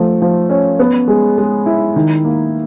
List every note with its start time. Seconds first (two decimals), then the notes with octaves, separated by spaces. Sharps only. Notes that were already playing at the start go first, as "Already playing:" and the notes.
Already playing: F3 A3
0.22 F3
0.50 C#4
0.79 B3
1.08 G#3
1.38 G#3
1.66 E4
1.96 D#3
2.25 A#3